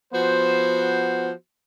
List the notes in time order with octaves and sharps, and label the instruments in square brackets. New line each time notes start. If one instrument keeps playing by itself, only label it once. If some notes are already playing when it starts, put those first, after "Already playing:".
[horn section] F3 B3 F#4 C5